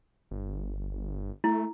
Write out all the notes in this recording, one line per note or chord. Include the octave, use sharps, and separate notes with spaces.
G1
A3 E4